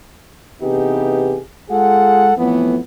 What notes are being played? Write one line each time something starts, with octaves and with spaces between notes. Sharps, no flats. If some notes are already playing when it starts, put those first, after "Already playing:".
C3 E3 B3 D#4 G4 G#4
G#3 F4 G#4 A4 F#5
F2 A2 E3 B3